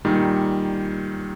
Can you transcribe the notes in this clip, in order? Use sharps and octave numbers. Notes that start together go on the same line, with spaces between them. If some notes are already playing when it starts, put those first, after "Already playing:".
A#2 D#3 G3